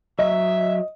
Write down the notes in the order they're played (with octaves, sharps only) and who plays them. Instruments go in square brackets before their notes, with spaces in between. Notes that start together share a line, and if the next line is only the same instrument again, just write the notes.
[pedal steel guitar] F#3 [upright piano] D#5 [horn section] E5